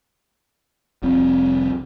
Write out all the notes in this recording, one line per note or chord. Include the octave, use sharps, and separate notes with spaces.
F1 C2 F2 C4